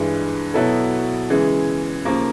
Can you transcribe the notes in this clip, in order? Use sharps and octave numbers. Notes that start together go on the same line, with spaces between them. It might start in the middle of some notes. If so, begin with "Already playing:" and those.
Already playing: G2 E3 G#3
B2 F#3 B3 E4 A4
C#3 E3 G#3
D#2 C#3 F3 A#3